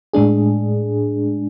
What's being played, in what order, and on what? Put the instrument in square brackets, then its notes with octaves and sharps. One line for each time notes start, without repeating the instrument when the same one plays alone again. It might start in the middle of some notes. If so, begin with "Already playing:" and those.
[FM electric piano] A2 G#3 D4 G#4